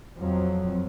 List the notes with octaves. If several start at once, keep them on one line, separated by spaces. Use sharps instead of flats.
F2 F3 F#3